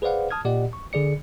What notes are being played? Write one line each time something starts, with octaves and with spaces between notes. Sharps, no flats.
G#4 B4 C5 D5 F5 F#5
A5 D#6 F6 G#6
A#2 G4 D5 D#5 F#5
C#6
D3 G#4 D5 C#7